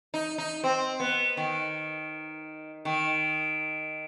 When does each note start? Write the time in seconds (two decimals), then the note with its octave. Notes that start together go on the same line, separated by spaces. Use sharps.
0.14 D#4
0.38 D#4
0.64 C4
1.00 B3
1.37 D#3
2.85 D#3